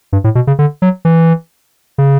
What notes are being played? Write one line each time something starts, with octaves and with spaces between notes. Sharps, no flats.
G2
A2
B2
C#3
D3
F#3
E3
C#3